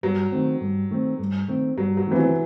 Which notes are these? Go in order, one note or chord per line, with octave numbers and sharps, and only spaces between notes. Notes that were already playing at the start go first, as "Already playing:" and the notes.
G2 F#3
D#3 A3 C4
G2
D#3 A3 C4
G2
D#3 A3 C4
G2 F#3
F#3
D#3 E3 A3 C4
F#3